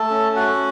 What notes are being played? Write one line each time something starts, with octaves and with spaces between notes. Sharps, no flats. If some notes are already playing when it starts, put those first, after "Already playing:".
Already playing: A3 A4 A5
C#4
F#4 F#5